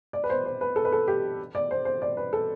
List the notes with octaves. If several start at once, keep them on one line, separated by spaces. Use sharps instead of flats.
D5
B4
C5
C5
B4
A4
B4
A4
G4
D5
C5
C5
D5
B4
A4